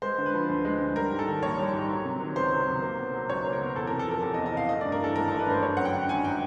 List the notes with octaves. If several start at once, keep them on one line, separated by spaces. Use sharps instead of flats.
G#3 C5
D3
B4
F3
D2
G#3
D3
G3 A#4
G#2
A4
D#3
A#1 C#5
G3
G#2
F#3
C3
D#3
C#2 C5
F#3
C3
A#3
B2
F#3
C#2 C#5
A#3
A#4
B2
E2 A4
A#4
C3
A4
F3 A#4
E2 A4
D#5
E2
D#5
C3 F5
A3 D#5
D5
G2
A#4
E3 A4
G#1 A#4
A4
A3
B4
G2 C5
F#3 C#5
F#2 F#5
G5
D3
G#1 G#5
F#3 G5